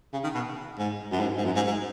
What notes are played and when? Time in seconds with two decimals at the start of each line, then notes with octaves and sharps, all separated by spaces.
0.13 C#3
0.24 D#3
0.35 B2
0.78 G#2
1.12 F#2
1.20 G#2
1.37 G#2
1.45 F#2
1.56 G#2
1.67 G#2